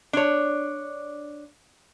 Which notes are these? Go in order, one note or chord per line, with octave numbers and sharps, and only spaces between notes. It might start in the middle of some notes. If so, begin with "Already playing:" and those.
D4 C#5